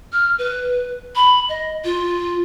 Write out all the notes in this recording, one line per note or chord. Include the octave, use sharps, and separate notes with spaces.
F6
B4
B5
D#5
F4